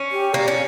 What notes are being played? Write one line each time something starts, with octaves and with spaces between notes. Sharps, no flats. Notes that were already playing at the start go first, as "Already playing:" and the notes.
Already playing: C#4
G4
A#3 D5
C#4